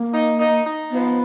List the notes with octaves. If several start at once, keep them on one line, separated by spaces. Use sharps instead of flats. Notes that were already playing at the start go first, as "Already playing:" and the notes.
Already playing: A#3
D#4
D#4
D#4
F3 B3